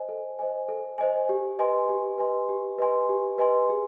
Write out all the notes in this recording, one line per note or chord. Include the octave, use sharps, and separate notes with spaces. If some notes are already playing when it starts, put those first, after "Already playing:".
Already playing: C5 D#5 G#5
A4
C5 D#5 G#5
A4
C5 D#5 G#5
G4
B4 D#5 G#5 C6
G4
B4 D#5 G#5 C6
G4
B4 D#5 G#5 C6
G4
B4 D#5 G#5 C6
G#4